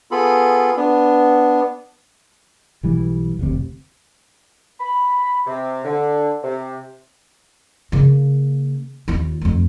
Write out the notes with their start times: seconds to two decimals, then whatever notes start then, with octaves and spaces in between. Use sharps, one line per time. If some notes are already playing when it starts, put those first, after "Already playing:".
0.11 B3 F4 G#4 A4 B5
0.77 B3 D4
2.83 B1 E3 G3
3.39 F1 D2 C3
4.80 B5
5.46 C3
5.85 D3
6.43 C3
7.92 C#3 A#3
9.08 D#2 F4
9.41 F2 A3